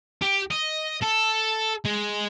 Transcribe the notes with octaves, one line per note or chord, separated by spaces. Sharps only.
G4
D#5
A4
G#3